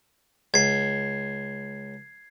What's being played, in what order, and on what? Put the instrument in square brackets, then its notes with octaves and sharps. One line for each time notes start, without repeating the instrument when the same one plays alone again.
[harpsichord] C#2 [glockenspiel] G#6 C7